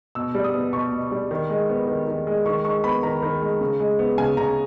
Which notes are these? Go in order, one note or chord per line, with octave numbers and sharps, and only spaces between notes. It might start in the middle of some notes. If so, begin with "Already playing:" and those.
B2 E6
G3
D#6
B3
B2 C#6
B2
G3
D#3
G#3
B3
D#3
D#3
G#3
D#3 C#6
G#3 C#6
B3 B5
D#3 A#5
D#3
G#3
C#3
G#3
B3
C#3 G#5
C#3 A#5